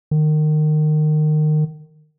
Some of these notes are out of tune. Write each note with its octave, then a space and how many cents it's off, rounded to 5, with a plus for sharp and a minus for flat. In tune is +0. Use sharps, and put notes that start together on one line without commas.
D#3 -25